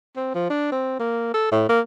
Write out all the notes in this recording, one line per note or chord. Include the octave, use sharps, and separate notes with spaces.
C4
F3
D4
C4
A#3
A4
A2
A#3